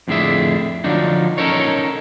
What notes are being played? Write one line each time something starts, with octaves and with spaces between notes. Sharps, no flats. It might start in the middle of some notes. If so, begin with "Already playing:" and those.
F2 A2 D3 D4 G#4 E5
D3 F3 F#3 D4 D#4
C#4 D#4 A4 A#4 C#5